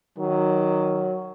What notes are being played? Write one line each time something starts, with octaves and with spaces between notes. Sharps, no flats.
D#3 F#3